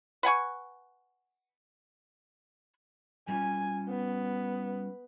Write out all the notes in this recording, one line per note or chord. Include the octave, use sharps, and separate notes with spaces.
B4 F#5 G#5 C#6
G3 C#4 F4 G#5
B3